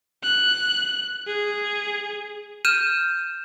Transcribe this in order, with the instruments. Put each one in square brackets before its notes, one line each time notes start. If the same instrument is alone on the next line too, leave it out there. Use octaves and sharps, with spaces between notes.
[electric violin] F#6
G#4
[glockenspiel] F6 G6 D#7 E7